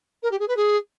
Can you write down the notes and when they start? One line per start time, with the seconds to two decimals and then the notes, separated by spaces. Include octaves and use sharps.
0.23 A#4
0.31 G4
0.40 G#4
0.48 B4
0.56 G#4